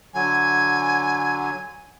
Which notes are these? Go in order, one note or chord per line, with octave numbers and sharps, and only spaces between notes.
D3 F#3 G#5